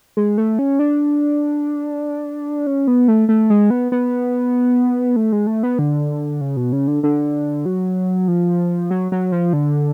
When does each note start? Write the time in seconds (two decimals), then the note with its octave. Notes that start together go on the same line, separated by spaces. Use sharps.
0.17 G#3
0.38 A3
0.59 C#4
0.79 D4
2.67 C#4
2.87 B3
3.08 A3
3.29 A3
3.50 G#3
3.70 B3
3.92 B3
5.16 A3
5.32 G#3
5.47 A3
5.63 B3
5.79 D3
6.41 C#3
6.57 B2
6.72 C#3
6.87 D3
7.03 D3
7.65 F#3
8.28 F3
8.91 F#3
9.12 F#3
9.32 F3
9.53 D3